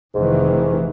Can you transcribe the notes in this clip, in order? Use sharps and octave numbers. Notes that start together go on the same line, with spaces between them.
F1 G#2 D#3 E3